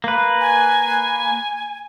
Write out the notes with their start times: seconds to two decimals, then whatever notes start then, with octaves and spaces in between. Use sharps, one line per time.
0.04 A#3 B4
0.41 G#5